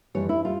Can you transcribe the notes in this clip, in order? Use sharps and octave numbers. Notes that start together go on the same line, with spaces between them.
F2 C#3 E3 G3 C#5
E4
G3 F4